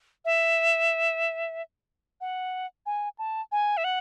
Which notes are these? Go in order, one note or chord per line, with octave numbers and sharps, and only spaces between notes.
E5
F#5
G#5
A5
G#5
E5
F#5